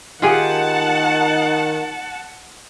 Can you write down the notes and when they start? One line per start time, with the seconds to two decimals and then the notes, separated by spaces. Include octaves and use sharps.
0.22 D#3 D#4 F4 G4 G#4 F#5 A5